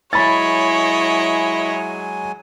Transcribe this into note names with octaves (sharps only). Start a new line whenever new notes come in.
F#3 G#3 E4 C#5 D#5 G#5 B5 A6